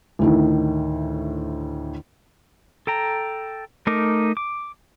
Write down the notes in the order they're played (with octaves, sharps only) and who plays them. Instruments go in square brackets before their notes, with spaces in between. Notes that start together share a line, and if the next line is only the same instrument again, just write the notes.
[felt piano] D2 A2 D#3
[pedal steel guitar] A4 G5 A#5
A3 D#4 A#4 D6
D6